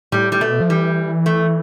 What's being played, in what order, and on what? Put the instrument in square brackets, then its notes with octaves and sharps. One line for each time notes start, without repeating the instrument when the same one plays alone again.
[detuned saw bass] A2 [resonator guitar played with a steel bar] G3
[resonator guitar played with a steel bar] G3
[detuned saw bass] B2 [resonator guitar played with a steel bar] A3
[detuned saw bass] F3
[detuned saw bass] E3 [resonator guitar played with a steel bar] G3
[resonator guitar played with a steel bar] A3